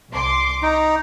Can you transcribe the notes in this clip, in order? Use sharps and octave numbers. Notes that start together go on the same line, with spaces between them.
C2 C6 D6
D#4 A#5